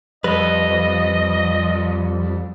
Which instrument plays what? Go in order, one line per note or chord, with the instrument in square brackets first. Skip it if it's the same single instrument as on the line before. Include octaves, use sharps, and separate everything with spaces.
[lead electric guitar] F2 [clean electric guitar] G3 B4 [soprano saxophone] D#5